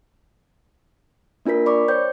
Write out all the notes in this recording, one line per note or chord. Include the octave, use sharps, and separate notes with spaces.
A#3 D4 F4 A#4 B6
D5 B5 C#6 D6
C5 C#5 G5 G6